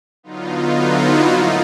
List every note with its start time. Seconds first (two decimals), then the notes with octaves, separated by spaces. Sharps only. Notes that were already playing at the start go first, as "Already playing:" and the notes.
0.23 D3 F#3 B3 D#4 F4
0.77 E4 F#4
1.30 A2 F3 A#3 D#4 F4